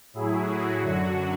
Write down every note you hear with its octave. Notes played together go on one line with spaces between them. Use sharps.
A2 F#3 E4 G#4
F#4
F#2 D3 F#3 F#4